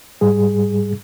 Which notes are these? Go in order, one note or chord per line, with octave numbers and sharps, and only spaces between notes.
G#2 G3 G#4